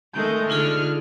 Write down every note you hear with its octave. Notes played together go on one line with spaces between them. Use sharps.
D#3 G#3 A3 G6
D3 D#4 F4 G#4 F6